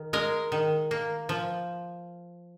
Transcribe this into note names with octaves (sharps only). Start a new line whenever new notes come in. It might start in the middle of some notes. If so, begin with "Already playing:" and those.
Already playing: D#3
G#3 A#4
D#3
A#3
F3